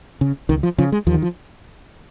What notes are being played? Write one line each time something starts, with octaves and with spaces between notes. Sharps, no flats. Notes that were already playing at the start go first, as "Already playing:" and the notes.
C#3
C#2 D#3
F3
C#3 F3
G#3
D#2 F3
D#3
F3